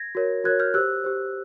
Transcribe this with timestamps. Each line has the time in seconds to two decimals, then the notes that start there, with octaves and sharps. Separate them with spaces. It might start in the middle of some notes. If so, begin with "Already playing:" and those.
Already playing: G#6 A#6
0.15 F#4 A#4 C#5
0.44 F#4 A#4 C#5 F#6 G#6
0.59 F6 G6
0.74 G4 C5 E6 F#6
1.04 G4 C5